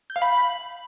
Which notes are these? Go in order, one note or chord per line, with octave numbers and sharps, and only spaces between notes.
G6
F5
B5